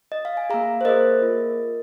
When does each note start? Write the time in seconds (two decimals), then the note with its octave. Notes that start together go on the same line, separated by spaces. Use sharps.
0.12 D#5
0.25 F5
0.37 G#5
0.50 A#3 G#4 F5 A#5
0.81 C5
0.85 A#3 G#4 A#4 D#5
1.21 A#3 F4 G#4